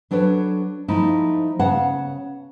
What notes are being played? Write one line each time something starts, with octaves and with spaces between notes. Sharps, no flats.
F#3 D4 A4 B4 C#5
F3 A3 D#4 E4
C#3 B3 C#5 F5 F#5 A5